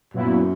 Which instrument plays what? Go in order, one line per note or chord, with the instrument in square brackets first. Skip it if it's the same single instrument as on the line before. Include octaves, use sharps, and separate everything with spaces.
[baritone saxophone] F#2 [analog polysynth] A#2 F#3 B3 E4